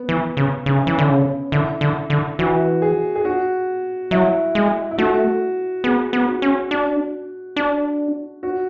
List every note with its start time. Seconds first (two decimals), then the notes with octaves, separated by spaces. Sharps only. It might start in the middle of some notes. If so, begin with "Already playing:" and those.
Already playing: B3
0.09 E3
0.37 C#3
0.66 C#3 C#4
0.87 E3
0.99 D3
1.09 C#3
1.52 D3 E4
1.81 D3
2.10 D3
2.39 E3 F#4
2.82 G#4
3.15 G#4
3.25 F#4
4.11 F#3 E4
4.55 G#3
4.91 E4
4.98 A3 F#4
5.84 B3 G#4
6.13 B3
6.28 F#4
6.42 C#4
6.71 D4
7.56 D4
8.43 F#4